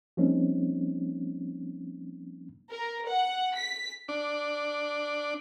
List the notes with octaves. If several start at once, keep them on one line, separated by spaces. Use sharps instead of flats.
F3 G3 A#3 C4 C#4 D#4
A#4
F#5
B6
D4